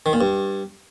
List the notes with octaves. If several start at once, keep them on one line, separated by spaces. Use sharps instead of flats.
D#3
A#2
G2